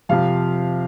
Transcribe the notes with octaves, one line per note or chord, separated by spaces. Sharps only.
F2 C3 F3 F5